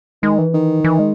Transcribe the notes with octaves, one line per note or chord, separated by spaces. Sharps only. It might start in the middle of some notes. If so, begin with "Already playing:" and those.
D#3 G#3
E3
D#3
E3
G#3